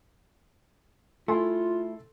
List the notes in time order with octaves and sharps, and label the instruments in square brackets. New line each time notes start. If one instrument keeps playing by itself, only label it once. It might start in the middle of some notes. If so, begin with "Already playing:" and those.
[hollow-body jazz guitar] A3 E4 [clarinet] F4 [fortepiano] A4 G#5 C6